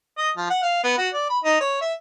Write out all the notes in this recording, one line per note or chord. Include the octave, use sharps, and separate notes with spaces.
D#5
F3
F#5
F5
B3
F#4
D5
B5
D#4
C#5
E5